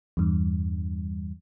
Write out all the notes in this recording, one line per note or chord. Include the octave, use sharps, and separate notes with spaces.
E2 G2